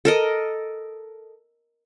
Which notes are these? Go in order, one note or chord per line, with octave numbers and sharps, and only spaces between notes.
A4 A#4 D#5